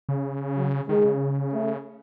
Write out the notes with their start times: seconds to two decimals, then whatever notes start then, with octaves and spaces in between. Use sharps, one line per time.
0.09 C#3
0.57 F#3
0.88 D#3 G#3
1.05 C#3
1.53 A3